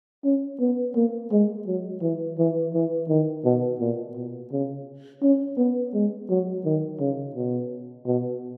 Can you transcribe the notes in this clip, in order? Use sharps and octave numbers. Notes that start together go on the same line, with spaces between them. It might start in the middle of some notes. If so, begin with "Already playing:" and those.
C#4
B3
A#3
G#3
F#3
E3
E3
E3
D#3
B2
A#2
B2
C#3
C#4
B3
G#3
F#3
D#3
C#3
B2
B2